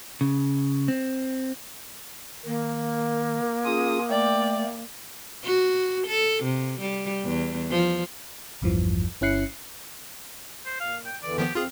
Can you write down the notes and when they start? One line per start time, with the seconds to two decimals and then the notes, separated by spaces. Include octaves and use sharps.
0.21 C#3
0.88 C4
2.46 D#3 A#3
3.65 C#4 F4 G#4 D#6
4.09 A3 D5 G5
5.44 F#4
6.07 A4
6.44 C3
6.81 G3
7.25 E2
7.70 F3
8.61 A1 E2 G2 E3 F3
9.21 G1 C#4 E4 F#6 C7 C#7
10.66 C5
10.80 A#2 F5
11.06 G5
11.23 E2 D3 E3 D5
11.38 D#3 F3 B3 G4
11.55 F2 C4 F4 G#4 F5